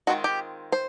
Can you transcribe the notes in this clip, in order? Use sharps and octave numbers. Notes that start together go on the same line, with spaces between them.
D#3 G#3 C4 F4 F#4
G4
C5